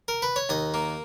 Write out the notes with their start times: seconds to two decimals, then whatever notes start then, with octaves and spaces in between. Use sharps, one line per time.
0.08 A#4
0.22 B4
0.36 C#5
0.49 D#2 D#5
0.74 A#3